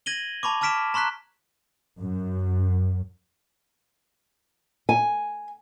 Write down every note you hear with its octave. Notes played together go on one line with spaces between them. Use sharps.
G#6 A#6 D#7 F#7 G7
A5 B5 C#6 D6
A5 D6 F6 B6 D7 E7
A#5 C6 C#6 F#6 B6
F#2
G#5